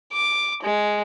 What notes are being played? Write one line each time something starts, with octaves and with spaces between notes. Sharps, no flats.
D6
G#3